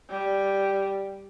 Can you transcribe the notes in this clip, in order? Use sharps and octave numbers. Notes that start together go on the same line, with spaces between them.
G3